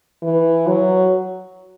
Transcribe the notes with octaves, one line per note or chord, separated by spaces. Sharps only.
E3
F#3